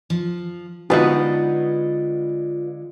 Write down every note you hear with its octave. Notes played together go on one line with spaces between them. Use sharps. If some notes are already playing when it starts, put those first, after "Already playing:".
F3
D3 G#3 B3 D#4 F4 F#4 B4 D#5